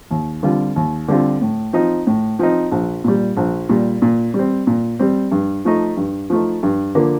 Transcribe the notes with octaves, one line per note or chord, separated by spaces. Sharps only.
D#2
D3 G3 C4 F4
D#2
D3 G3 C4 F4
A2
F3 C4 D#4
A2
F3 C4 D#4
A#1
A#2 G3
A#1
A#2 G3
A#2
G3 C4
A#2
G3 C4
G2
F3 A3 D#4
G2
F3 A3 D#4
G2
D3 F3 A#3